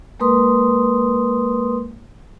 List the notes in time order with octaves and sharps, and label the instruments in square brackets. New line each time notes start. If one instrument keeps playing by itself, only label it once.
[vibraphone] G#3 A#3 A#4 B4 C6 D#6